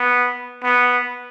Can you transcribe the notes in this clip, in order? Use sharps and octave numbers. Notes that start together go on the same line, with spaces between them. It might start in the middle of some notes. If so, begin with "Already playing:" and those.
Already playing: B3
B3